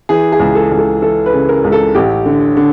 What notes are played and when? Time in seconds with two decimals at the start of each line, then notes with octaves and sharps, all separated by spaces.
0.09 E3 G#4
0.32 G#4
0.40 C#2
0.55 A4
0.71 C#2
0.79 A4
1.02 E3 A4
1.26 B4
1.33 C#3
1.49 A#4
1.64 C#2
1.72 A4
1.95 A1 G4
2.26 D3
2.57 D3